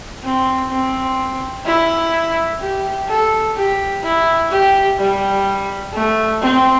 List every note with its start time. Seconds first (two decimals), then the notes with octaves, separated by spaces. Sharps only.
0.23 C4
0.71 C4
1.66 E4
2.61 G4
3.08 A4
3.56 G4
4.03 E4
4.51 G4
4.99 G3
5.93 A3
6.41 C4